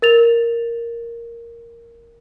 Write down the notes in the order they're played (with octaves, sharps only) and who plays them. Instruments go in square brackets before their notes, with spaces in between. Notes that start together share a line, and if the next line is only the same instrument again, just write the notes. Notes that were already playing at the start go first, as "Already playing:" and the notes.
[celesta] A#4 A6 F7